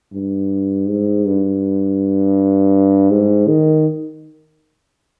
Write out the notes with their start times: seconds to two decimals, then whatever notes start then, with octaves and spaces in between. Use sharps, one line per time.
0.14 G2
0.88 G#2
1.25 G2
3.11 G#2
3.48 D#3